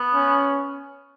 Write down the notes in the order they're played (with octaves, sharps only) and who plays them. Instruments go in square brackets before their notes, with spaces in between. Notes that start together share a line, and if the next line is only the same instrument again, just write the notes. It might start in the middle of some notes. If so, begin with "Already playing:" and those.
Already playing: [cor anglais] B3
[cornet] C#4